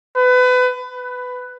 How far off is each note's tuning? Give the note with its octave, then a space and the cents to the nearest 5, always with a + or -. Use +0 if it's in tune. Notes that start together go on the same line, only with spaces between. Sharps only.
B4 +30
B4 +10